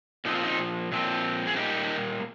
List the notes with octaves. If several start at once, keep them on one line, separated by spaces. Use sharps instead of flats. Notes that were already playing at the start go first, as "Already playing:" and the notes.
A#2 F3 C4 D#4
F4
C4 D#4
A#2 F3 C4
G#4
A#2 G3 A#3 D#4 G4